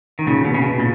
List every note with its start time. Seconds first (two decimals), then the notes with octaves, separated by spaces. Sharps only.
0.19 D#3
0.26 A#2 C#3
0.45 B2
0.54 C#3
0.62 B2
0.80 A#2